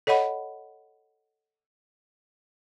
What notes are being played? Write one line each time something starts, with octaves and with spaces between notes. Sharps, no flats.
A4 C#5 D#5 F#5 B5